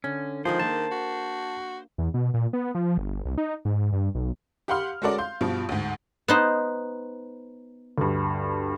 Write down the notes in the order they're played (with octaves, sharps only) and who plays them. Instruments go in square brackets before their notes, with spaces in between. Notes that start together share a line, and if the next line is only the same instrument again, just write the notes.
[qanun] D3 [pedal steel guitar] C#4
[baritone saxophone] D#3 [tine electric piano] F3 [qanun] G#3 D4 G#4 [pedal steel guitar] C5
[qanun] A#3 [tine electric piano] A5
[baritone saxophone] F#4
[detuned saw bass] E2
B2
A#2
B3
F3
G1
C2
D#4
G#2
G2
B1
[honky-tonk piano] G4 F5 F#5 B5 C6 F6
G#3 C#4 F#4 A4 A#4 D5
F5 C6 G6
G2 B2 F3 F4
D2 G#2
[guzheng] B3 D#4 C5
[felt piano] D2 G2